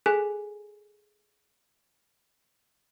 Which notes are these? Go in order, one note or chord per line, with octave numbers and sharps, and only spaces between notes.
G#4 A4 G#5 F#6 B6